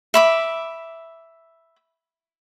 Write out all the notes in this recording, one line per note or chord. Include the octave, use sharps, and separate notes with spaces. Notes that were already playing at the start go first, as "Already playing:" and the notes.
E5 B5 D6